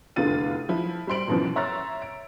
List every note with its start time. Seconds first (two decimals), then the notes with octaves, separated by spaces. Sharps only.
0.16 F1 E2 D3 F4 A6 D#7
0.69 F3 E4
1.07 G3 C5 C6 D7 F#7
1.28 C2 F#2 B2 E3 F3
1.56 C#5 E5 A#5 C6 E6 A6
2.02 D7